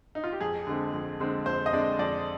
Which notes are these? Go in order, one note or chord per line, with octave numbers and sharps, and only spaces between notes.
D#4
F4
G4
F2 G#4
D3 G#3 C4
F2
D3 G#3 C4
F2 C5
D#5
D3 G#3 C4 D5
F2 D5